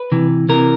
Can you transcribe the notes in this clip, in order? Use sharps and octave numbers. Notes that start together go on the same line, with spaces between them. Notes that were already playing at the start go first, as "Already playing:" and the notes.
Already playing: B4
C3 E3
C3 E3 A#4